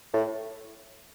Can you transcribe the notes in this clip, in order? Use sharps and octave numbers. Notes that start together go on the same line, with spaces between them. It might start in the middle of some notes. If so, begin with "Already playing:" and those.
A2